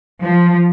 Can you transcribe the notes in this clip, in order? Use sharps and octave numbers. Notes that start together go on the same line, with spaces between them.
F3